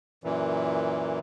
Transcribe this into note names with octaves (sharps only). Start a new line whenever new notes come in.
F#2 A#2 E3